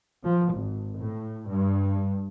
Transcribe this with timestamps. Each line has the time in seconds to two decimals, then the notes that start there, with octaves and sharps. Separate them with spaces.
0.24 F3
0.53 G#1
0.98 A2
1.48 G2